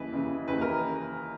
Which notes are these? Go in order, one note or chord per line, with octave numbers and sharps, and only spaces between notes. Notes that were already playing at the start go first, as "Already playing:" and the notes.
Already playing: D#2 C#3 E3 B4
D#2 C#3 E3
D#2 C#3 E3 B4
A#4